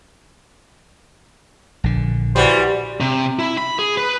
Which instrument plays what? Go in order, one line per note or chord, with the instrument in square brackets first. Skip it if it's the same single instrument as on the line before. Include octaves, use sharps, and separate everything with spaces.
[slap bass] A#1 D3
[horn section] E3 F#4 C5 [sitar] G3
[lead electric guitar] C3
E4
B5
G#4
B4